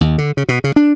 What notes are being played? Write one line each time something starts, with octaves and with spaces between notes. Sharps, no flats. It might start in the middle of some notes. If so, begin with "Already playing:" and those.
D#2
D3
C#3
B2
C#3
D4